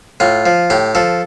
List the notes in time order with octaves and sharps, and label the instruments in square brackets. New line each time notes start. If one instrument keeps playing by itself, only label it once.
[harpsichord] A2 F4
F3
A2 G4
F3 A4